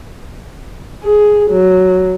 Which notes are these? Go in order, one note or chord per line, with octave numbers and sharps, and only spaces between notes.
G#4
F#3